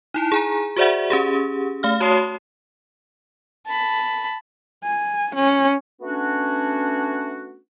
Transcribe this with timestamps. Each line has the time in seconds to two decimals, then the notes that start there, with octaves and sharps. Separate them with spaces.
0.14 D#4 E4 A5
0.32 G#4 G#5 A#5
0.76 F#4 G#4 C5 D5 E5 F#5
1.10 C#4 G4 G#4
1.83 A3 F5 F6
2.00 F#4 C#5 A5 C6 D#6 C7
3.67 A5 B5
4.84 G#5
5.35 C#4
6.01 A3 B3 C#4 D4 F#4